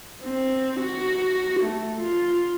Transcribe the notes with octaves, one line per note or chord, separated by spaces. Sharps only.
C4
F#4
A3
F4